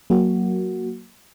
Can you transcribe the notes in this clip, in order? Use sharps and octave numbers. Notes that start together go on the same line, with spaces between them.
F#3 A#3 F#4